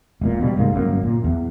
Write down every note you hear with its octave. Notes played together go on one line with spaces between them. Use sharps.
E1 A#2
B2 D3 G3
C2 G#2 F#3 A#3
G1 F#2 C3 A#3
A#2
E2